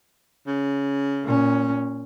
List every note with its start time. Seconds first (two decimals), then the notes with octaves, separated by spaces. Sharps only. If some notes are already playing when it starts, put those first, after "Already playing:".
0.47 C#3
1.24 A#2 C#4